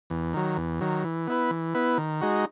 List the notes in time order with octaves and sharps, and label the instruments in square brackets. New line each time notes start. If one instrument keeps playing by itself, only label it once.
[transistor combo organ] E2
D#3 F#3
E2
D#3 F#3
E3
B3 E4 B4
E3
B3 E4 B4
D#3
G#3 D#4 F#4